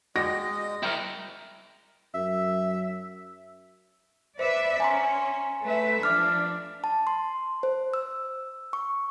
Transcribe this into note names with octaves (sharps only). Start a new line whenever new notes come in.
G#3 F#4 D5 D#5 G5 A#6
E4 A#4 G5
F#2 E5
B4 C5 D5 E5
C#4 G#5 A#5 C6
A3 B4 E5
F3 D4 D6 F6
A5
C6
C5
E6
C#6